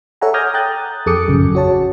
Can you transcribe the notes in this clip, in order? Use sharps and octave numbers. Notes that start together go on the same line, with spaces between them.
A4 C#5 E5 F#5 G#5 A#5
D6 D#6 F6 G6 G#6 A#6
G5 A#5 D#6 F#6 G6 A6
F2 G#4 A4 D6 D#6 C#7
A1 F#2 C#3
F#4 C#5 A5